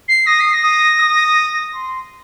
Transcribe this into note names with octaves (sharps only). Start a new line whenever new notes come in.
C7
D#6 A#6
C7
A#6
D#6
D#6
C6